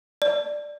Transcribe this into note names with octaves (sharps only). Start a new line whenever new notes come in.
D5